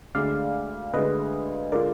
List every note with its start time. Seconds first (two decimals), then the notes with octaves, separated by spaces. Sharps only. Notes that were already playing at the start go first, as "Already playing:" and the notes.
0.15 D2 D3 G#3 D5 F5
0.93 D2 D3 G#3 B4 D#5
1.72 D3 G#3 D4 F4 A#4 D5